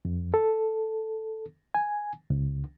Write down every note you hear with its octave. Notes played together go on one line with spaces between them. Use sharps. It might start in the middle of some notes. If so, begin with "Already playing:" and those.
F2
A4
G#5
C#2